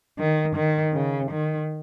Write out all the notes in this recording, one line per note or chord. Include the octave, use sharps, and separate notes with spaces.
D#3
D#3
C#3
D#3